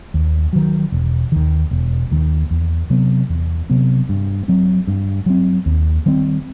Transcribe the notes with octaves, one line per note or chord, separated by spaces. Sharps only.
D#2
D#3 F#3
E1
D#2 D#3
E1
D#2 D#3
E2
C3 F#3 B3
E2
C3 F#3 B3
G2
F#3 C4
G2
F#3 C4
D#2
D#3 G3 C4